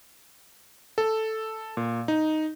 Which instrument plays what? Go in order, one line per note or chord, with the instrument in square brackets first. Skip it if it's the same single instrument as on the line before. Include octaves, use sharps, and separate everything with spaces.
[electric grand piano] A4
A#2
D#4